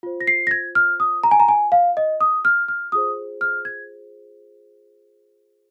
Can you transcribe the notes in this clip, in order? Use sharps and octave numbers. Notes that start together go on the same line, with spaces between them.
F4 C5
A#6
C7
A#6
G#6
F6
D#6
A#5
G#5
A#5
G#5
F5
D#5
D#6
F6
F6
F4 G#4 C5 D#6
F6
G#6